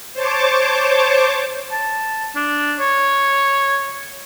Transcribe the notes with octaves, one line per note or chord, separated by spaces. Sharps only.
C5 C#5 A5 D6
A5
D4
C#5